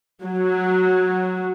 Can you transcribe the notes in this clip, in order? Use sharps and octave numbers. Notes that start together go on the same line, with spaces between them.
F#3